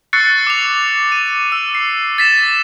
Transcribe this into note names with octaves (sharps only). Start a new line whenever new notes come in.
C#6 E6 F#6 A6 C7 C#7
D6 F7
D#7
E6
C7
A6 B6 E7